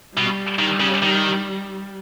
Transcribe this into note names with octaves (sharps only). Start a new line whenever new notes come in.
B2 G3
D#3
C#3
D#3